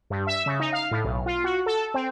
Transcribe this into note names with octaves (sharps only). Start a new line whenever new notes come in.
G2
E5
C#3
D#4
F5
A2
B1
F4
F#4
A4
C4